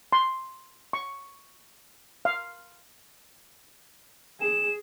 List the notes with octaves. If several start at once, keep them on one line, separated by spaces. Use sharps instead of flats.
C6
C#6
F5
G#4 E7